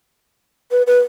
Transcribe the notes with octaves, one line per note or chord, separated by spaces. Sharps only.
B4
B4